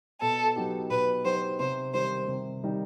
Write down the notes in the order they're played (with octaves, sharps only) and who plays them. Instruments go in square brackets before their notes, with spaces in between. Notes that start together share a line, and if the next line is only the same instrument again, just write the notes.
[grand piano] B2 [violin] A4
[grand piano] F#3 B3 D#4 G4
[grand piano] B2 [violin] B4
[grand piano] F#3 B3 D#4 G4 [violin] C5
[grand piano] C3 [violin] C5
[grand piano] D#3 G3 D#4 G4 [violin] C5
[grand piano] C3
D#3 G3 D#4 G4